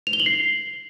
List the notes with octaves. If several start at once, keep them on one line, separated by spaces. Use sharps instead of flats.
F7
G7
F#7
C7